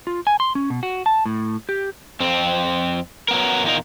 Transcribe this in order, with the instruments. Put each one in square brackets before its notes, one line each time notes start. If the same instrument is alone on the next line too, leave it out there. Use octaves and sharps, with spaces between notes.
[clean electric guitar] F4
G#5
C6
C#4
B2
F#4
A5
A2
G4
[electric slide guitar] F2 C4
F#3 B3 A#4
E2 A#2 A#3 D#4 A#4